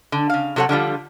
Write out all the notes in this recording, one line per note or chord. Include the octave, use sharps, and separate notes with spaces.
D3
C#3 F5
C3 F#3 A4 C#5 F#5
D3 F3 G3 F4